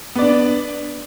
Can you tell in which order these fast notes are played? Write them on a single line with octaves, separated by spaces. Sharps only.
B3 D5 D4